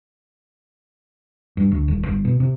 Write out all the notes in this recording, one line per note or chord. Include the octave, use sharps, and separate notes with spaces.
G2
D2
D#1
G1
B2
C3